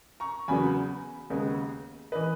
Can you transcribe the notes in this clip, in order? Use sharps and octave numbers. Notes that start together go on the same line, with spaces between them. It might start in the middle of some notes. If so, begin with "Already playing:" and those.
A#5 C#6
E2 C#3 F#3 B3 G#5 B5
D#2 C#3 G#3 B3
E3 B4 D#5